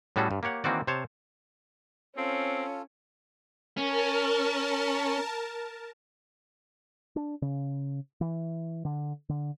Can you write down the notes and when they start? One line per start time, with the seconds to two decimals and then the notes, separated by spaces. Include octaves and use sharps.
0.16 A2 G3 C#4 F#4 G#4 A4
0.31 G2
0.43 A#3 G4 C#5 F#5
0.64 D#3 E3 A#3 C4 F#4 D5
0.87 C3 C5 C#5 A5
2.17 C4 C#4 F4 A4
3.77 C#4 A#4 A5
7.16 D4
7.42 C#3
8.21 E3
8.85 D3
9.29 D3